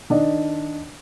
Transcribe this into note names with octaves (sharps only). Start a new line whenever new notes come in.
D#3 D4 D5 D#5